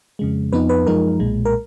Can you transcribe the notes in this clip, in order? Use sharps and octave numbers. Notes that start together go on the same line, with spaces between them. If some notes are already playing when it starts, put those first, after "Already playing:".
F2 C#3 G#3
F2 F3 B3 D#4 B4
B4
F#2 F3 G#3 D#4 A#4
B1 A#2 G#3
A#4